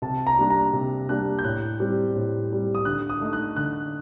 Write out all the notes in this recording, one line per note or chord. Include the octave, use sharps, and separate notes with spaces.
C3 A5
A#5
G3 A#3 D4
A#5
C3
G3 A#3 D4 F#6
G6
A2 F#6
G3 C4
A2
G3 C4
D#6
D3 F#6
D#6
A3 D#4
F#6
D3 F#6